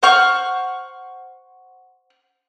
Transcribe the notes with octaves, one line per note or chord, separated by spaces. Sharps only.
C5 F#5 C#6 F6